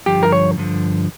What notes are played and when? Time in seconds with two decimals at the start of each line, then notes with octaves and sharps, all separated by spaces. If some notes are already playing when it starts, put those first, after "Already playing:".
0.06 G2 D3 F3 G4
0.23 A#4
0.32 C#5
0.58 G2 D3 F3